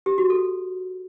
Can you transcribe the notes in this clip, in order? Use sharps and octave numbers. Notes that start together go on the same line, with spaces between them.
G4
F#4
A4